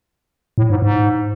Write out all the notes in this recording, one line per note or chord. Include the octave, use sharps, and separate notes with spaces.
A2
G#2
G#2